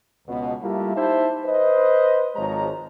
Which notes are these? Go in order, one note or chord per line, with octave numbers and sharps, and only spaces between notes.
C#2 B2
G3 A3 A#3 E4 F4 G4
D#4 E4 G4 C5 E5 A5
B4 C5 D#5
G#1 F3 G#3 C#5 A#5